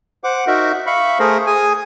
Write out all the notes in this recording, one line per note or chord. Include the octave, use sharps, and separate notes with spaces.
C5 F#5 D6
D#4 F#4 A#4 E5
E5 F5 B5 C#6
A3 G#4 A#4 C5
G#4 G#5